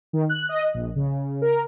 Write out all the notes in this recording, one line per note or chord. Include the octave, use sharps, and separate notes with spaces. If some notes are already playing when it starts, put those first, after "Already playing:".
D#3
F#6
D#5
A#1
C#3
A#4